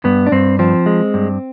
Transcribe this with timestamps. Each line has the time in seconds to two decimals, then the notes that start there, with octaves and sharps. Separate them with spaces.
0.04 G2 B3
0.27 D4
0.32 G2 C4
0.59 F3 C4
0.86 G#3
1.14 G2